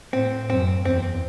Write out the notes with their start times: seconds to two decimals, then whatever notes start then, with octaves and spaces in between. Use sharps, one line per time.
0.13 A2 C4
0.49 F#2 C4
0.85 E2 C4